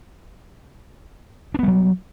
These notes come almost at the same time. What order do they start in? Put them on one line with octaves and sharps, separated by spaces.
D4 B3 G3 F#3